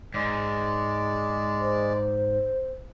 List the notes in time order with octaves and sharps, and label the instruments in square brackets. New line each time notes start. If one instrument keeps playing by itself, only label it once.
[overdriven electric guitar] G#2 [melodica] G#3 D5
[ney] C5